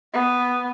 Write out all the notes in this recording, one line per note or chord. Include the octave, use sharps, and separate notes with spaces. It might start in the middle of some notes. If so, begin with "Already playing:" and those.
B3